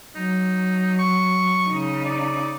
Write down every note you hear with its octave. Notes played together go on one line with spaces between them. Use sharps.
F#3 D#4
C#6
C#3 D#4
D5